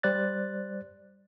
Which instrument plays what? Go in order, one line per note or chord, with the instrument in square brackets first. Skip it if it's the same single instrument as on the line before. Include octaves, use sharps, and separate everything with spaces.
[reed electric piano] G3 C5 D5 F#6 A6